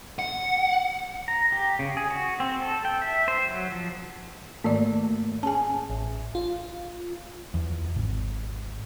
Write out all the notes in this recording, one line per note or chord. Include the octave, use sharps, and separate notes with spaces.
F#5
A#5
G4
C#3
G#4
F#4
C4
A4
G5
E5
C5
F#3
F3
G#2 D#3 A3 A#3 D5
C#4 G#4 G#5 A5
A1
F4
E2
G#1